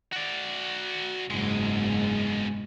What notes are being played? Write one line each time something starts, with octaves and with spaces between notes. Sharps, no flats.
F#4 D5
F#1 G#2 B2 G#3